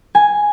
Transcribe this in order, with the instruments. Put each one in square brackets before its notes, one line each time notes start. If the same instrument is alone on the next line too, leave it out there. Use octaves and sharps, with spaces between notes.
[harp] G#5